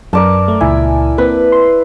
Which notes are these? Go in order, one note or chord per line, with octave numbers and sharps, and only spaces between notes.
F#2 A#4 D5 A5
A3
C#2 A#2 E4 G#5
A#3 C4 B4
C6